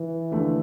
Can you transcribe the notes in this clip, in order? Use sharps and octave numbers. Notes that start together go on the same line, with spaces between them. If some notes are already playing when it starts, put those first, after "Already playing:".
Already playing: E3
D#2 D3 F3 A3